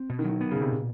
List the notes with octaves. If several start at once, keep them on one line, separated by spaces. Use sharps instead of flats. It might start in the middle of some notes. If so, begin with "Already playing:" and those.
Already playing: C4
B2
D#3
F#3
D#3
B3
C#3
B2
C3
A#2